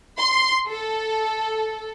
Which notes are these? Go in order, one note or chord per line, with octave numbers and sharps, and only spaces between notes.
C6
A4